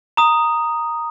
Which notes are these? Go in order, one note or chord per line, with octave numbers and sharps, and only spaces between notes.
A#5 D#6